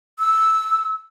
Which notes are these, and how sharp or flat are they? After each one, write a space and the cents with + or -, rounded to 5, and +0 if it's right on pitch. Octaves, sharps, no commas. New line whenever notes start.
E6 -10